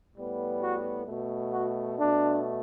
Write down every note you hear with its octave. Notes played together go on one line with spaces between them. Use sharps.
A2 G3 B3
F#4
B2 A3
F#4
B2 A3 D4